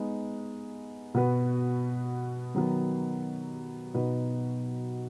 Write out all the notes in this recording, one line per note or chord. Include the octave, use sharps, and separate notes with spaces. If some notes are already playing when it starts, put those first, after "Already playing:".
Already playing: G#3 B3 D#4
B2 B3 F#4 B4
D#3 F#3 B3
B2 B3 D#4 F#4 B4